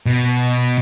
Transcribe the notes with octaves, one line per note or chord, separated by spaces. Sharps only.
B2